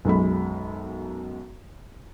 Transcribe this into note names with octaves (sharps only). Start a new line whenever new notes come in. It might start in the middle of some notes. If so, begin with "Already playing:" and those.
B1 F#2 G#3 B5